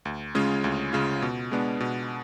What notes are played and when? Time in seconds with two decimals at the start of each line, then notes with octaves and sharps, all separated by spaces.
0.05 D2
0.35 C#3 G#3 C#4 F4
0.64 D2
0.93 C#3 G#3 C#4 F4
1.22 B2
1.51 G#3 B3 D4
1.80 B2